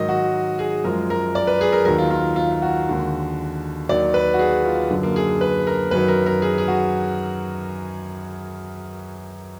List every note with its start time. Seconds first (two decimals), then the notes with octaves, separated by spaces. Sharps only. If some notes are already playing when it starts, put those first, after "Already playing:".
Already playing: G#2 D#3 F#3 D#5
0.09 F#4
0.59 G#4
0.84 F#2 F3 G#3 A#4
1.10 A#4
1.35 D5
1.47 B4
1.61 G#4
1.72 A#4
1.85 D#2 D#3 F#3 A#4
1.98 F4
2.11 F4
2.36 F4
2.51 F4
2.62 F#4
2.88 D#2 D3 G#3
3.89 D#2 D#3 F#3 D5
4.14 B4
4.34 F#4
4.39 G#4
4.65 F4
4.90 F#2 D3 F#3
5.03 A#3
5.16 G#4
5.41 B4
5.67 A#4
5.91 F#2 D#3 F#3 B4
6.08 A#4
6.26 A#4
6.42 G#4
6.58 G#4
6.68 F#4